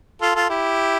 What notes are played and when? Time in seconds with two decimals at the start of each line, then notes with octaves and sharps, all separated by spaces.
0.21 F4 A4
0.35 F4 A4
0.49 E4 G4